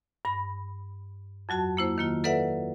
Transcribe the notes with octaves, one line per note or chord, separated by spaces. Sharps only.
G2 B5
F2 F#3 F#4 A5
A#3 E4 C5
D#3 A#3 F4
A4 B4 D5 E5 F#5